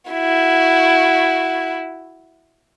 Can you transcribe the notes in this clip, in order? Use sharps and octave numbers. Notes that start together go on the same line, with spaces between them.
E4 F#4